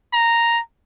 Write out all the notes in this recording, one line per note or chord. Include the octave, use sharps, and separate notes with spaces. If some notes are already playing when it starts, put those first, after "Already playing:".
A#5